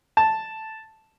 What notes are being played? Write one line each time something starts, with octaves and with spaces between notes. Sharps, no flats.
A5